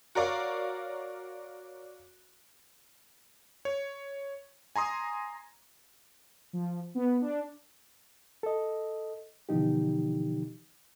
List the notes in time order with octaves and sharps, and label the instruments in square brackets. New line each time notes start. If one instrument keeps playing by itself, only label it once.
[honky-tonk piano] F#4 A#4 C#5 D5 F5
[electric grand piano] C#5
G#5 A#5 C6 D#6
[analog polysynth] F3
B3
D4
[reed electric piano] A4 D#5
B2 D3 E3 F3 D#4 G4